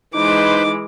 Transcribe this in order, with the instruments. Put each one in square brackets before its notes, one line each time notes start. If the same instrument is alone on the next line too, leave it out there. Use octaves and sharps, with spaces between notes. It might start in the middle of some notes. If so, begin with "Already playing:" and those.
[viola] E3 G#3 [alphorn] D#4 [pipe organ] B4 C5 [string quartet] D6